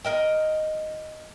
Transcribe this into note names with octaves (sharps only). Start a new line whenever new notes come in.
A#4 D#5 G5